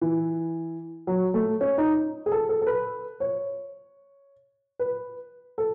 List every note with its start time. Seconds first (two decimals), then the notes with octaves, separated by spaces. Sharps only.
0.01 E3
1.07 F#3
1.34 A3
1.61 C#4
1.78 D#4
2.26 G#4
2.32 A4
2.49 A4
2.61 A4
2.66 B4
3.20 C#5
4.79 B4
5.58 A4